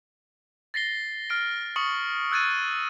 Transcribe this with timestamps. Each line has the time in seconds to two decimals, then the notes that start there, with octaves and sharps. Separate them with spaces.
0.74 A6 A#6 C7 G7
1.30 F6 D7
1.76 C#6 D#6 C#7 F#7
2.31 E6 F#6 G#6 A6 D#7